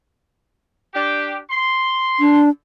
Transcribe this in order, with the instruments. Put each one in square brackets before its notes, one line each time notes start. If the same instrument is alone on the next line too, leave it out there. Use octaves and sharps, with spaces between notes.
[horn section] D4 G4
C6
[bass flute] D4